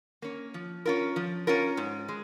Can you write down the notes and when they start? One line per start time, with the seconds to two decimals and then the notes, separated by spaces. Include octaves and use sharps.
0.22 A#3 C#4
0.54 F3
0.86 C#4 F4 A#4
1.16 F3
1.47 C#4 F4 A#4
1.77 G#2
2.08 G#3